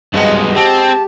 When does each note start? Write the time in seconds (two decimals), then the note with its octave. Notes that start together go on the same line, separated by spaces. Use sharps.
0.14 B1 G2 F3 G#3 F#4 D#5
0.56 C4 G4 A5